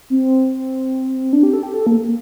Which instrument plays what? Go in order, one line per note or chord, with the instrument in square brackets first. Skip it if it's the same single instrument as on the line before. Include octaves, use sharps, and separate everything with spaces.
[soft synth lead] C4
D4
G4
A4
G4
A4
A#3
A#3